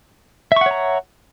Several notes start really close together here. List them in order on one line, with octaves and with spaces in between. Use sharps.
E5 C#6 F#5 C#5 A#5